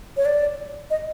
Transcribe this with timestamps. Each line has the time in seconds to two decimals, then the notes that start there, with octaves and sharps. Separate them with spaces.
0.17 C#5
0.25 D5
0.90 D#5